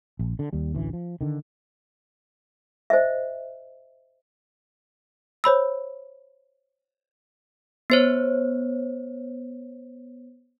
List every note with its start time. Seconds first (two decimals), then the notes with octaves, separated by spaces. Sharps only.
0.19 A#1
0.39 D3
0.53 D#2 G3
0.74 A1 D2 E3
0.93 F3
1.21 D3 D#3
2.90 C5 D#5 E5
5.44 C5 C#5 B5 E6
7.90 B3 C5 C#5